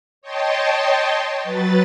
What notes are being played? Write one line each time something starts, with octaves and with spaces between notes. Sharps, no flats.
C#5 D#5 G5 A5 C6
F#3 B4 A6